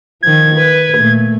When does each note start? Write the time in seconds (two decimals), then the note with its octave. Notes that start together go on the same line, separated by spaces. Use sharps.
0.23 D#3 F3 G#6
0.55 B4
0.96 A#2 A3